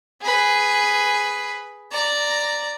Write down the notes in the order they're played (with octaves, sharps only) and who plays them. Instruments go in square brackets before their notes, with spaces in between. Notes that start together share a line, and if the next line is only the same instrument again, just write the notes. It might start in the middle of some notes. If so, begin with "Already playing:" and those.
[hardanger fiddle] G#4 B4
D5 A#5